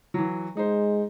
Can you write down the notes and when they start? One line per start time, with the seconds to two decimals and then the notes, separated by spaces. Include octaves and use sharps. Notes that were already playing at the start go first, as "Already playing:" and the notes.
0.14 E3 F#3
0.57 G#3 D#4 C5